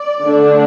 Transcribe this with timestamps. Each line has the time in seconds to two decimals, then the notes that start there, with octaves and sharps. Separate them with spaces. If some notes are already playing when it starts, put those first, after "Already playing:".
Already playing: D5
0.23 D3 A3 D4